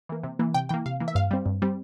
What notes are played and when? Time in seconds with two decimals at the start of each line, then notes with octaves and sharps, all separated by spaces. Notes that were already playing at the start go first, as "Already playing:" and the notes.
0.09 E3 A#3
0.23 C3
0.39 E3 A#3
0.54 C3 G5
0.69 E3 A#3 G5
0.86 C3 F5
1.00 E3 A#3
1.08 E5
1.15 G2 F5
1.31 G3 C4
1.46 G2
1.62 G3 C4